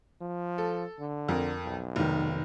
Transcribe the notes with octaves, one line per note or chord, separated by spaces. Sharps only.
F3
A4
D3
F2 A#4
B1
F1 D#3